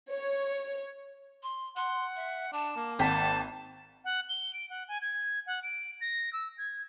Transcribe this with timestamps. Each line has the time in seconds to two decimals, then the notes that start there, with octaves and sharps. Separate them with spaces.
0.11 C#5
1.43 C6
1.77 F#5 C6
2.16 E5
2.53 D4 A5
2.76 A#3
2.99 G#1 F#5 G5 A5 B6
4.05 F#5
4.29 G7
4.53 D7
4.70 F#5
4.88 G#5
5.02 G#6
5.47 F#5
5.63 D7
6.01 A#6
6.33 E6
6.58 G#6